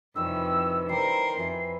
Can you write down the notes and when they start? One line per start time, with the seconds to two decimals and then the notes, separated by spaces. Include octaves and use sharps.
0.16 F2 C3 D#3 E3 G3 E6
0.89 G3 A#4 C5 C7
1.38 F2 B4 E5 G#5